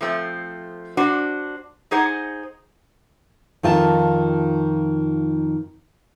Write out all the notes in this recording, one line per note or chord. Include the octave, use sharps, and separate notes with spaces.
F3 A3 C4
D4 F#4 C5
D#4 G#4 C5 F#5
F2 D#3 F4 A5